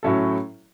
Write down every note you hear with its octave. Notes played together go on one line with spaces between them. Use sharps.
A2 F#3 C#4 E4 A4